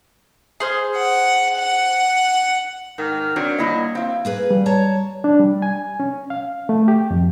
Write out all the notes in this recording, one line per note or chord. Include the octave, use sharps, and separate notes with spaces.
G#4 C5 F6
F#5
F#5
G#2 D#3 F6
F#3 C4 D4
G3 A#3 E4 D#5
C4 E4 F5
A#3 G#4 B4
G3
C#5 A5 A#5
D4
G3
G#5
C#4
F5
A3
G4
F2